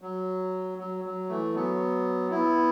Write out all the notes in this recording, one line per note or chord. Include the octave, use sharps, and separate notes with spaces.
F#3
F#3
F#3
E3 A3
F#3 B3
B3 E4